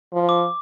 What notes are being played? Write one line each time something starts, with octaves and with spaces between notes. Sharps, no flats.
F3
D6